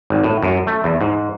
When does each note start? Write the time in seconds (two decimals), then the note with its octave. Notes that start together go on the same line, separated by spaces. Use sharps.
0.10 G#1
0.24 A2
0.42 F#2
0.67 A3
0.84 E2
1.01 G#2